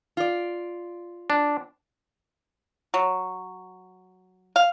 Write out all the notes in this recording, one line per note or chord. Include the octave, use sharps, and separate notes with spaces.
F4 D5
D4
F#3
F5